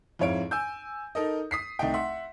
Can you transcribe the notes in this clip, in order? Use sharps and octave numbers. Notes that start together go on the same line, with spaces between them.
F2 G#2 E4 C#5 F5 D7
G#5 E6 G6
D#4 A4 A#4 D#5
D#6 B6 C7
C2 A3 D#4 D#5 G5
E5 F#5 C6